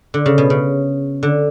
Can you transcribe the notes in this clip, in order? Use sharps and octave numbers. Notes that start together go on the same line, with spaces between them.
D3
C#3
B2
C#3
D3